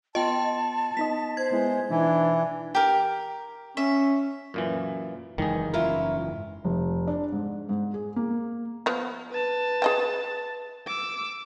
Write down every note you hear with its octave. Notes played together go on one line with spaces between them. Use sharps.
B3 F4 D#5 G5 A5 C6
B3 D#4 D#5 B6
C5 G#6
G#3 B3 E4
B2 E3 D4 D#4
G4 A#4
C#4 E5
F#2 A#2 E3
F#1 G#2 D#3 E3 G3 G#4
C#4 E4 F4 A#4
F1
D4
G#2
G#2
G#4
A#3
F3 B3
B4 A5
G#4 D#5 G5
D6 E6